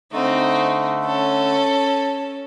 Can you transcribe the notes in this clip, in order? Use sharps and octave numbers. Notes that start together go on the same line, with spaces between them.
D3 A3 C4 D#4
C#4 A4